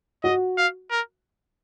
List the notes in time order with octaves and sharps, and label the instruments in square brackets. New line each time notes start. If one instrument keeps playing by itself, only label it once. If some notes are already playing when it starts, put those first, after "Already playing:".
[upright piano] F#4 [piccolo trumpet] D#5
[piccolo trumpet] F5
A#4